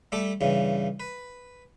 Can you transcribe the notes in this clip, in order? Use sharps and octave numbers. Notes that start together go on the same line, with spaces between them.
G3 A3 A4 D6
G2 C#3 E3
B4